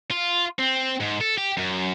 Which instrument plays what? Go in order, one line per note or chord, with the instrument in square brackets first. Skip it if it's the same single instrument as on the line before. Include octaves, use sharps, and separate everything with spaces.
[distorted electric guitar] F4
C4
G#2
A4
G4
F#2